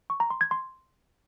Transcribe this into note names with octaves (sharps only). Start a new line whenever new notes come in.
C#6
A#5
C6
G#6
C6